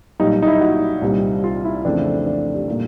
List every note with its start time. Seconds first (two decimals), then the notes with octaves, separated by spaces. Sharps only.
0.19 B1 A#2 G3 D#4
0.42 D#4
0.47 E4
0.61 F#4
1.02 C2 A#2 G3 C4
1.44 F4
1.64 E4
1.85 F2 C#3 E3 A3 C4 D4
2.26 D4
2.54 G4
2.68 A#2 G3 A#3